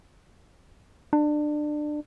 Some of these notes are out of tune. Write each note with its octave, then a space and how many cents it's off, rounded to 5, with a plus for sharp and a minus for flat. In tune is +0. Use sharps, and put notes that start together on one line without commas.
D4 +25